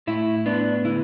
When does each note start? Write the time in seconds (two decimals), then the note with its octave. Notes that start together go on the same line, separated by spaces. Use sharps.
0.07 A2 E4
0.46 B3 D4
0.85 D3 E4